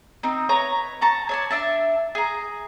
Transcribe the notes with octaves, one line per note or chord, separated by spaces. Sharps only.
C4 D#4
B4 C#5 A#5
A5 A#5 C#6
C#5 D5 A5
D4 E5 A5
G#4 A#5